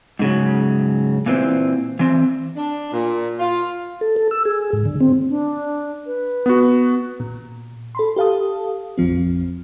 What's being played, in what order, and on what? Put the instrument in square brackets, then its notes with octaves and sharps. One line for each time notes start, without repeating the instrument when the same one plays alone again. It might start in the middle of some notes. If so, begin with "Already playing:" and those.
[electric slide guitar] G#2 C#3 F#3
A#2 E3 C4
E3 C4
[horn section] D4
A#2
F4
[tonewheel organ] A4
A4
E6
G#4
G#2
D3
C4
[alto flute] D4
B4
[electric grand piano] B3 F#4
[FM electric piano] A#2
A4 B5 C6
G4 A4 F5 A5 D#6
A1 F2 F3 C4